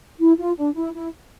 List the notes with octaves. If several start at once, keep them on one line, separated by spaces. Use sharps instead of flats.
E4
F4
D4
E4
E4